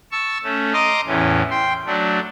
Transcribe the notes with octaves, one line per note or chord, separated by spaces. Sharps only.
A5 C#6 E6
A3 C#4
D#5 A#5 C6 D6 D#6
E2 A2 E3 C#4
G5 C6
F#3 A3 D4